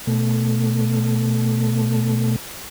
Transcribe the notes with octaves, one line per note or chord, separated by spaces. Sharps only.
B2 A3